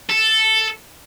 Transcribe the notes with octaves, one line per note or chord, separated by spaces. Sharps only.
A4